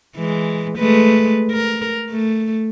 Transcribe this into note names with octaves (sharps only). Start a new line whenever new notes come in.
E3 G#3
G#3 A3 B4
A#4
A3